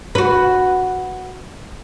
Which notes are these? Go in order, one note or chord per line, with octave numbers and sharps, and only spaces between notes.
F#4 B4